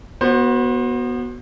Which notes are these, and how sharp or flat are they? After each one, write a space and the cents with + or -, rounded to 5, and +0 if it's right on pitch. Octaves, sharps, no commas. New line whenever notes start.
B3 -20 F#4 +5 C5 +25